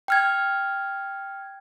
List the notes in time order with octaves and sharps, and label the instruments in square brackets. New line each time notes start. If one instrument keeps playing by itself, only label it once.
[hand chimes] G5 F6 G#6